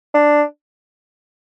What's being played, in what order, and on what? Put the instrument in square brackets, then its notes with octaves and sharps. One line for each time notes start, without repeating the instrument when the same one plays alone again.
[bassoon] D4